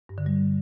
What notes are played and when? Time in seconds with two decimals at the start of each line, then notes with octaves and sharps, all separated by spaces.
0.09 G2
0.18 D3
0.26 G3